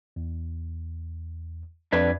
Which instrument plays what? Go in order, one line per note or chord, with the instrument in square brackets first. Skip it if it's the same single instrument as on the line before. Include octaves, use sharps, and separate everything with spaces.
[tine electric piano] E2
[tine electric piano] F2 G#6 B6 [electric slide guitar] D4 B4 D5